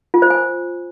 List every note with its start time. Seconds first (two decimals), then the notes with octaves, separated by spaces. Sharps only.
0.14 F4
0.22 C5
0.30 G#5